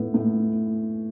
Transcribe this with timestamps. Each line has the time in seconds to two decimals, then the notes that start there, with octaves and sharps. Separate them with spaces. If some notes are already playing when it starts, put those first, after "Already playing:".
Already playing: A2 B3
0.14 A2